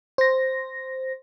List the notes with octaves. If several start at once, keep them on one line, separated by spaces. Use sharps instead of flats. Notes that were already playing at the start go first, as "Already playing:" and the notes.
C5 A#6